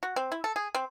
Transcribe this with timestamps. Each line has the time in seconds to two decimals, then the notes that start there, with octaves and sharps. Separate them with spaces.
0.03 F#4
0.16 C4
0.32 E4
0.44 A4
0.56 G#4
0.75 C4